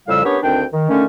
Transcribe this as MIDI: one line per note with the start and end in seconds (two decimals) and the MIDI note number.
0.07 0.22 41
0.07 0.22 45
0.07 0.22 49
0.07 0.22 55
0.07 0.22 77
0.07 0.22 88
0.24 0.37 59
0.24 0.37 61
0.24 0.37 62
0.24 0.37 67
0.24 0.37 70
0.24 0.37 73
0.43 0.64 38
0.43 0.64 51
0.43 0.64 60
0.43 0.64 62
0.43 0.64 79
0.73 0.86 51
0.89 1.04 50
0.89 1.04 51
0.89 1.04 57
0.89 1.04 61